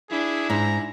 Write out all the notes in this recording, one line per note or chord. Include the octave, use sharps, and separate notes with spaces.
D4 E4 G#4
G#2 A#5